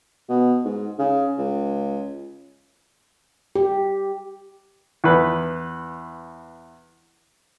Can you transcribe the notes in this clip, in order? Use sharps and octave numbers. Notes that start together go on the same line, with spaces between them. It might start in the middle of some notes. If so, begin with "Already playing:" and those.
B2
G#2
C#3
C#2
G4
E2 B4